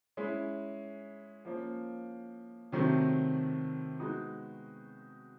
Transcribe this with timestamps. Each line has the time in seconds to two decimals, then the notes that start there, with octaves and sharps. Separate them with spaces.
0.17 G#3 C#4 E4
1.45 F3 A#3 C#4
2.72 C3 D#3 F#3 A3 C4
4.00 G#3 B3 D#4 F#4